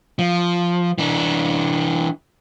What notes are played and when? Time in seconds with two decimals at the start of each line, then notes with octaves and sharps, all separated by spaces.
0.19 F3
0.98 E3 D4